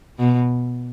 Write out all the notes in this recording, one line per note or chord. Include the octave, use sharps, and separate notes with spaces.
B2